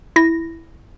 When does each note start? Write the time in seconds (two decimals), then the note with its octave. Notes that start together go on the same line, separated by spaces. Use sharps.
0.16 E4 A#6